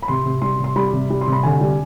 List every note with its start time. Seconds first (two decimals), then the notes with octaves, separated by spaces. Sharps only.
0.02 B5
0.08 C3 C6
0.26 C3
0.42 G3 C6
0.59 C3 C6
0.76 G3 B5
0.93 C3
1.10 G3
1.21 C6
1.28 C3 B5
1.43 D3 G#5
1.61 G3